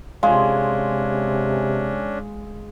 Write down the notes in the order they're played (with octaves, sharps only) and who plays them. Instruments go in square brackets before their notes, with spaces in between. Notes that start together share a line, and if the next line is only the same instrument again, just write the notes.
[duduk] C3 [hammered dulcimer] G#3 [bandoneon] C#4 D4 [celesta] F5